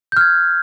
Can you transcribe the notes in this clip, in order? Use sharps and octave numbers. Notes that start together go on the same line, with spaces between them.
F6 G6 G#6